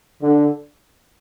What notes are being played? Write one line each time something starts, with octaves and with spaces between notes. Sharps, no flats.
D3